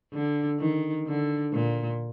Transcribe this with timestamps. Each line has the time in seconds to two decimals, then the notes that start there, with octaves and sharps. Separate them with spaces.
0.13 D3
0.59 D#3
1.07 D3
1.53 A#2